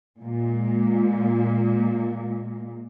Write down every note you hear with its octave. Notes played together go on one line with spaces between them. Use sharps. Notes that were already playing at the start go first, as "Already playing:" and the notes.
A#2 G#3